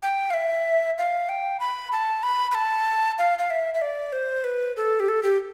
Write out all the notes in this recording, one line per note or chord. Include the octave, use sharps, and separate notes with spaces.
G5
F5
E5
F5
G5
B5
A5
B5
B5
A5
F5
F5
E5
E5
D5
C5
B4
A4
G4
A4
G4